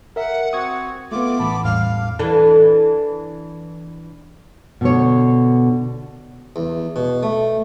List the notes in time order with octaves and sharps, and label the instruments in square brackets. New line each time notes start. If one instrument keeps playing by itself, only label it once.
[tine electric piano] A#4 E5 [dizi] F#5
[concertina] C4 F#4 [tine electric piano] D#6 G#6
[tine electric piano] A3 B3 [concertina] F4 [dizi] D6
[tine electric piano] A1 [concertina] B3 A5 B5
[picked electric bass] E2 A2 G3 [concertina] F5 [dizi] F6
[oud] E3 D4 A4
[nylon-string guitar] B2 D3 C#5
[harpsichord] E2
B2
A3